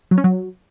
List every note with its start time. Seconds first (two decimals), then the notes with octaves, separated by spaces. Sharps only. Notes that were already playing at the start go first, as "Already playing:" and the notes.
0.11 F#3
0.18 C#4
0.24 F#3